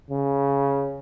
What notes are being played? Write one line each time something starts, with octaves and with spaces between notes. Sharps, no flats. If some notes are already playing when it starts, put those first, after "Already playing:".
C#3